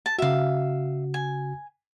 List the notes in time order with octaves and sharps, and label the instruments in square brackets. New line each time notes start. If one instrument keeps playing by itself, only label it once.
[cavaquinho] A5
[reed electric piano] C#3 F#4 [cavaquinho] E5 F5
[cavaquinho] G#5